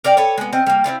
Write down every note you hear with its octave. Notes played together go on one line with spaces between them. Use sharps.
A#4 D5 F5 G5
A4 B4 C#5
G#3 B3
C4 C#4 D#5
G3 A#3
C4 C#4 E4 F4